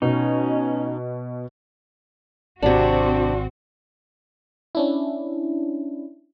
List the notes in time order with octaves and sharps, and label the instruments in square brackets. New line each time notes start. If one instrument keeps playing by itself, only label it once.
[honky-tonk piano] B2 [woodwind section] C#4 [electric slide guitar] D#4
[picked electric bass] G#1 [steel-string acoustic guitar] C3 D4 [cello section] C4 F#4
[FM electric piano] C#4 D4 E4